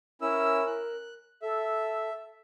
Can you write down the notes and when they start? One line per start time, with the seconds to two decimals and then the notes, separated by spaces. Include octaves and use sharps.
0.21 C#4 E4 A#4 E6
0.67 F#6
1.42 A4 E5